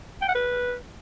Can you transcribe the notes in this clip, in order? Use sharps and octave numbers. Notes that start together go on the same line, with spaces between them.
G5
F#5
B4